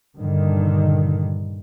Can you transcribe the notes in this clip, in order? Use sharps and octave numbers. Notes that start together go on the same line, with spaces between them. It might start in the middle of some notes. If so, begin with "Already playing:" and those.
G2 A#2 D3 D#3